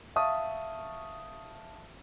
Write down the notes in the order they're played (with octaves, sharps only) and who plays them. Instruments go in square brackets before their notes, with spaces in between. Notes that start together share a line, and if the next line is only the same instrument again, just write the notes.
[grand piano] E5 F5 A5 C#6 D#6